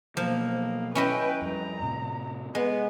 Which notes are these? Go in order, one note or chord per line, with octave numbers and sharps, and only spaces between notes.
B2 F3 F#3 A#3
C#4 E4 B4 D#5 G5
F2 G3 A#5
A2 C3
G#3 B3 B4